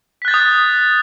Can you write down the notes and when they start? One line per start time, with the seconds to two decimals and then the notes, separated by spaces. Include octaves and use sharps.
0.22 B6
0.25 F#6
0.28 A6
0.31 G6
0.34 D#6